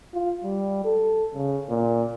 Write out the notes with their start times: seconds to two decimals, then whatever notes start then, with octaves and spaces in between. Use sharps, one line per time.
0.14 F4
0.44 G3
0.84 A4
1.35 C#3
1.70 A#2